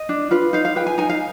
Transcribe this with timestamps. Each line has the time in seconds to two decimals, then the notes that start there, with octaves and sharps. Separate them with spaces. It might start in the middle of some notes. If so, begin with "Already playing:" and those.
Already playing: D#5
0.09 D4
0.31 F4 B4
0.53 D#4 F5
0.65 F5
0.76 G#4 B4 G5
0.86 G#5
0.98 D#4 G#5
1.09 F5